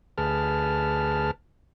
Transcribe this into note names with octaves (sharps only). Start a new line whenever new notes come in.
D2 G#4 B4 A5 F6